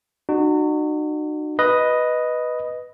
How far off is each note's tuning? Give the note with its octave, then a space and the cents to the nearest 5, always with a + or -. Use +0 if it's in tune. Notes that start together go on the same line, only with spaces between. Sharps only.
D#4 -45 F#4 +0
B4 +0 D#5 +0